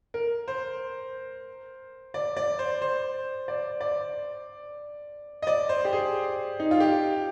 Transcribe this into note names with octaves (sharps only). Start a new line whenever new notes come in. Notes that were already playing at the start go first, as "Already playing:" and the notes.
A#4
C5
D5
D5
C5
C5
D5
D5
D#5
D5
C5
G4
G#4
D#4
F4
G4